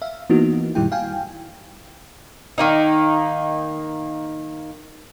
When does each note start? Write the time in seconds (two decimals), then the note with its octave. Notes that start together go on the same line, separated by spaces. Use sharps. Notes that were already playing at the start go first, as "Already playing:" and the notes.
0.02 E5 F5
0.30 E3 A#3 B3 D#4 F#4
0.75 F#2 A#2 D#3 G3 E4 G5
0.92 F5 G5 G#5
2.58 D#3 A#3 D#4